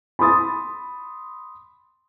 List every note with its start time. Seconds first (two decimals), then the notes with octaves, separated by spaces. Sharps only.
0.19 B5 C6 D#6 A6